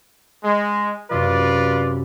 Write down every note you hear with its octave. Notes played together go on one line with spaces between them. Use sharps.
G#3
F#2 C3 F#3 F4 B4 D5